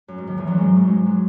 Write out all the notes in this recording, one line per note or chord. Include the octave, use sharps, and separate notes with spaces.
F#2
G#2
D#2 D#3
E2 E3
F#2 F#3
G#2 G#3
F#2 F#3
G#2 G#3
F#3